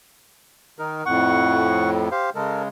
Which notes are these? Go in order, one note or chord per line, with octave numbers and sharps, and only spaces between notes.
D#3 D#4 A#4
F2 A2 F#5 C#6
G4 C5 F5
C#3 G#3 A4 A#4